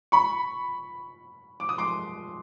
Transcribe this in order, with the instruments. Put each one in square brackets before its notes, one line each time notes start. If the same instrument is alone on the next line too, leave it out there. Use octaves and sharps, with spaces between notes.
[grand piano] B5 C#6
D6
D#6
C6 D6